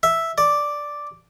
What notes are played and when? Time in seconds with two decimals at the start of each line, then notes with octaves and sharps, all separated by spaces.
0.03 E5
0.38 D5